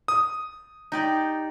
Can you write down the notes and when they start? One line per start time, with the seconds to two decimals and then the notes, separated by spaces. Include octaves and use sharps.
0.08 D#6
0.92 D#4 G4 D5